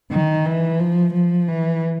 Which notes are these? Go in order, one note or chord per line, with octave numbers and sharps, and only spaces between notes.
D#3
E3
F3
F3
E3